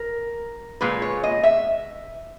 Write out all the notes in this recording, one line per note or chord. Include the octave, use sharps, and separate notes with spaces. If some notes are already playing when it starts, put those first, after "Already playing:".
Already playing: A#4
A#2 G#3 B4
C#5
D#5
E5